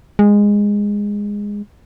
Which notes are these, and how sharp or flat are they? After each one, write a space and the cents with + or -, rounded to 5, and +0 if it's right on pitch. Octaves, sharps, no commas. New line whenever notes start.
G#3 -15